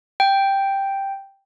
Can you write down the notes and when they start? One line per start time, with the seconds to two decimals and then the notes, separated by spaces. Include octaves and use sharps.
0.20 G5